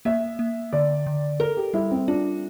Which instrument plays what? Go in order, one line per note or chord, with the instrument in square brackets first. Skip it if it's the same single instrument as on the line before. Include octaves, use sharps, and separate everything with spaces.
[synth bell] A#3 [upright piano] E5
[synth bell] A#3
[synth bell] D3 [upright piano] D5
[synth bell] D3
[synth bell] A4 [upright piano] A#4
[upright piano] G4
[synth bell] G3 [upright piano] E4
[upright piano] C4
[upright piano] D4 [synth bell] F4